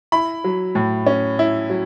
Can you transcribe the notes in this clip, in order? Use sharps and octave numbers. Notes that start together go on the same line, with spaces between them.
E4 B5
F#3
A2
C#4
E4
F#3